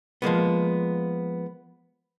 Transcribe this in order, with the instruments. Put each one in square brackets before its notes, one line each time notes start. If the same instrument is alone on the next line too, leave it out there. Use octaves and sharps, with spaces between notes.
[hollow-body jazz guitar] F3 G#3 A#3 B3